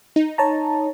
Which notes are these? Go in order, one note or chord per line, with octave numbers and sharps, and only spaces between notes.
D#4
C#5 A5 A#5